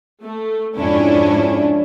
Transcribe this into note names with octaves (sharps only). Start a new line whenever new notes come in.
A3
F2 G#2 C#4 D4 E4